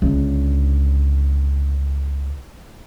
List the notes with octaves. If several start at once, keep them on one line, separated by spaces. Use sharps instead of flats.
C#2 D3